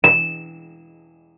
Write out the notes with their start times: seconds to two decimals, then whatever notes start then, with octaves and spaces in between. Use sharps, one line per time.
0.04 E7